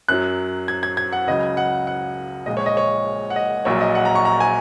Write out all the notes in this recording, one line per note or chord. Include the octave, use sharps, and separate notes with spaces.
F#2 F#3 F#6
G#6
G#6
G#6
F#5
C#2 C#3 F#3 D#5
F#5
F#5
A#1 A#2 G#3 D#5
C#5
D#5
C#5
F#5
D#5
A#1 A#2 F#3 C#5
D#5
F#5
A#5
C#6
A#5
G#5